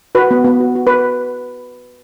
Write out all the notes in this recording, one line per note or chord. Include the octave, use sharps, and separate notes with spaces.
F#4 B4
B3
B3
F#4
F#4
B4